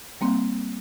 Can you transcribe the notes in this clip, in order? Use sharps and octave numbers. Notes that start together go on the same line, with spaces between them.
G3 A#3 C4